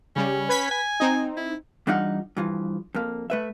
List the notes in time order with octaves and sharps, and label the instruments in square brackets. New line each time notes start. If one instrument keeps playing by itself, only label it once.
[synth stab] C#3 G3 [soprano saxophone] C#4
[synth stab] B4 G#6 B6
[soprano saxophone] G#5
[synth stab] C4 D#4
[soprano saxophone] E4
[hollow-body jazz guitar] E3 G3 D4 D#4 F4 F#5
G2 E3 F3
F2 A#3
A3 B4 E5